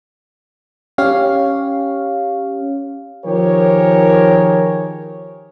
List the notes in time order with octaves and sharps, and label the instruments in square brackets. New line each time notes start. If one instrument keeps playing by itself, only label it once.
[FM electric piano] C#4 G4 C#5 F5
[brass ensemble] D#3 F3 G4 G#4 A#4 C#5